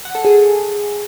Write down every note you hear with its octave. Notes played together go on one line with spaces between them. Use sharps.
F#5
A4
G#4